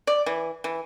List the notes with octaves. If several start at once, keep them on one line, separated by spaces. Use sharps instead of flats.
D5
E3
E3